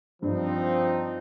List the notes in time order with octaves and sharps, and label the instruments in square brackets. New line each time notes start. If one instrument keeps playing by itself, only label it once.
[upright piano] G2 [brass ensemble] F3 C4 D#4